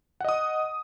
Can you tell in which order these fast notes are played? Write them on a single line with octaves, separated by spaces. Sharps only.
F#5 D#5 D#6